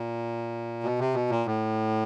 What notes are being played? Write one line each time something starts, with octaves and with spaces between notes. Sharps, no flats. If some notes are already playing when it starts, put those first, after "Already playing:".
Already playing: A#2
B2
C3
B2
A#2
A2